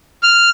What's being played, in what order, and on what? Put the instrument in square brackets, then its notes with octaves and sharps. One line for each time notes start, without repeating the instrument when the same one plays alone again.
[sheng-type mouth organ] F6